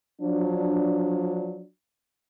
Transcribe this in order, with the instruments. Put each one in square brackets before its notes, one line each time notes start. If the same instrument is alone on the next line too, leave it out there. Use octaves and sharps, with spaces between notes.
[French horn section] F3 F#3 D4